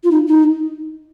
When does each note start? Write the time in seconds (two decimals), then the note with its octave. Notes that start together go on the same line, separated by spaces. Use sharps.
0.04 F4
0.11 D#4
0.27 D#4